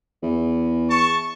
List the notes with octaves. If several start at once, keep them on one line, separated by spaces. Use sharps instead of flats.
E2
A5 C#6